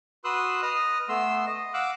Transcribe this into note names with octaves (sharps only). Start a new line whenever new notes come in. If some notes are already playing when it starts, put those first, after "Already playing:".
F#4 B4 C6 D#6 E6 F#6
B4 D#5 D#6 F6
A3 B3 C6 E6
D#5
F5 F#5 D6 E6 F#6